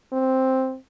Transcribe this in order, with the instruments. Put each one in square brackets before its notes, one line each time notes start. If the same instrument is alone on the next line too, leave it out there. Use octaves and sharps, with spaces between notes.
[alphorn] C4